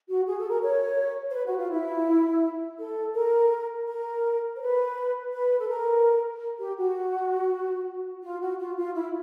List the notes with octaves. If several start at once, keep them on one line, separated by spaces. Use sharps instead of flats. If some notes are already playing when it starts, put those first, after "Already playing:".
F#4
G#4
A4
A#4
C#5
C5
B4
F#4
F4
E4
A4
A#4
A#4
C5
B4
B4
A4
A#4
G4
F#4
F4
F#4
F4
F4
E4